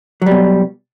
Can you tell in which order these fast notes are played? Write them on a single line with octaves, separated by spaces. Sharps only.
F#3 G3 B2